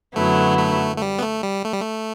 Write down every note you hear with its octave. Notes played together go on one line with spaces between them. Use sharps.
F#2 D3 F#3 A3 B3 E4
A3
A3
G3
B3
A3
G3
A3
G3
A3